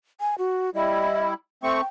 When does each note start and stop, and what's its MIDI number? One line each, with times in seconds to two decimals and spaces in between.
0.21 0.35 80
0.38 0.70 66
0.75 1.34 55
0.75 1.34 64
0.75 1.28 75
1.63 1.81 57
1.63 1.81 60
1.63 1.87 79
1.63 1.81 85